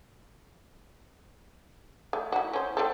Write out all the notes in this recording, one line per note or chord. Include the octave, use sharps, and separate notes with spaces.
A3
E4 F#4
C#4 C5
A3 C4 A4